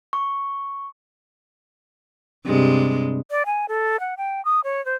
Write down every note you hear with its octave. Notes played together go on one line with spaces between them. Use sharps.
C#6
G2 C3 G#3
D5
G#5
A4
F#5
G5
D#6
C#5
C5